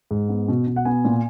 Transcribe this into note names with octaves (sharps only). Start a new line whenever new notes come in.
G#2
B3
B2
B2
F#5
B3 G#5
A#2